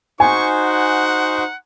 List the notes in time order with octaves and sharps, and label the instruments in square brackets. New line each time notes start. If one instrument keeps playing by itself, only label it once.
[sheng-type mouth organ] D#4 F#4 C5 [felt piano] G#5 [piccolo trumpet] C#6
[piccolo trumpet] F#5